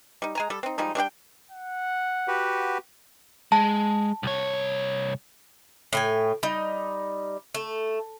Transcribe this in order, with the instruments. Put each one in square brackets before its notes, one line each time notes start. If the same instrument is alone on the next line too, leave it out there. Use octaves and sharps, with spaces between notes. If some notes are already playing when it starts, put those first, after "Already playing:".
[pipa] G3 D#4
G#3 G#5 A#5
G3 A4
C4 D#4
F3 G3 G#3 D#4
G3 D4 F#4 G5
[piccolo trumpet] F#5
[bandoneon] F#4 G4 B4
[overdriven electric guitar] G#3 [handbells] A5
[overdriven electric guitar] C2 C#5
[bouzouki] A2 G5 G#5
G3 D#4
A3